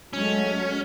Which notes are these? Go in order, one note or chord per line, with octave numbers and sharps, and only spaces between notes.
F#3 G#3 A3 C#4